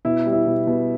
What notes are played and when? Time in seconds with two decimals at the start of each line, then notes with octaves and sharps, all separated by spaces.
0.05 B2 E4
0.26 G3
0.32 E4
0.46 B2
0.67 B2